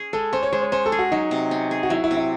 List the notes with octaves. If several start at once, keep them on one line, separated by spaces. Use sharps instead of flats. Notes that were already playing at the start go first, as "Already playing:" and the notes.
Already playing: C#4 G#4
G#3 A4
C#4 C5
C#5
G#3 C5
C#5
C#4 C5
A4
G#4
F#4
F#3 D#4
C3
C#4
G#4
F#4
F#3 E4
E4
C3
E4